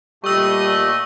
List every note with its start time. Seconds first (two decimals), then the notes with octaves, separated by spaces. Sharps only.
0.24 A#2 G3 A3 G4 D#5 C#6 E6